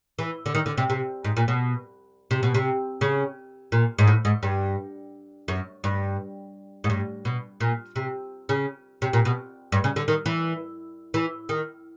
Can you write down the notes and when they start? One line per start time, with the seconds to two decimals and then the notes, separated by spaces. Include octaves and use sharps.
0.19 E3
0.46 D3
0.55 D#3
0.66 D3
0.77 C3
0.90 C3
1.25 G#2
1.37 A#2
1.48 B2
2.31 C3
2.43 B2
2.54 C3
3.01 C#3
3.72 A#2
3.99 G#2
4.07 A2
4.25 G#2
4.43 G2
5.48 F#2
5.84 G2
6.84 G#2
6.90 G2
7.25 B2
7.60 A#2
7.96 C3
8.49 C#3
9.02 C3
9.13 A#2
9.25 B2
9.72 G2
9.84 C#3
9.96 D3
10.08 D#3
10.26 E3
11.14 E3
11.49 D#3